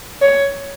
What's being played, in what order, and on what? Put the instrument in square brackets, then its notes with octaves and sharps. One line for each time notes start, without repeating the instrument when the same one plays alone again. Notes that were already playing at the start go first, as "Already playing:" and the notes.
[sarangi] C#5